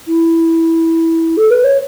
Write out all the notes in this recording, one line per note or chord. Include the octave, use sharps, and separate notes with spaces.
E4
A4
B4
C#5